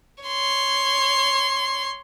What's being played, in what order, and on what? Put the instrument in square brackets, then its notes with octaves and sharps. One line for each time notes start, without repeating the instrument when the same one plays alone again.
[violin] C#5 C6